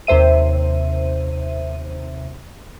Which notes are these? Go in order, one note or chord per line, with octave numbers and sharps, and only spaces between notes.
D#2 C3 C5 E5 D#7